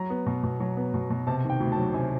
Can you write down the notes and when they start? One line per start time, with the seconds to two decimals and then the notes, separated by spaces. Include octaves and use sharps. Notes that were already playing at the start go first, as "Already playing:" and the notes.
Already playing: F#3 A#5
0.10 B3
0.26 B2
0.43 B2
0.60 F#3
0.77 B3
0.94 B2
1.10 B2
1.27 C3 A5
1.44 D#3
1.50 G5
1.60 D2
1.72 A5
1.77 F#3
1.94 C3 G#5